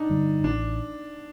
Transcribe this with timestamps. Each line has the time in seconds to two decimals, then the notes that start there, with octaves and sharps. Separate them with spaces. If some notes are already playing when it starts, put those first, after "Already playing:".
Already playing: D4 D#4
0.10 G2 D3 G3
0.44 A1 D4